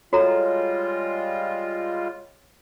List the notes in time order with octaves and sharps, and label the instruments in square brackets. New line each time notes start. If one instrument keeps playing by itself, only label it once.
[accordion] G3 G#3 F4 [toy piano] F#4 A4 A#5 [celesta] C#5